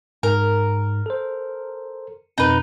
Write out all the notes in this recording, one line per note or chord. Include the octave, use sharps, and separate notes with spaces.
G#2 A#4
A4 C5
F2 B2 C4 D#4 B4